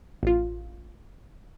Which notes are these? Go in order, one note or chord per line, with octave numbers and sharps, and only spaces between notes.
A1 F4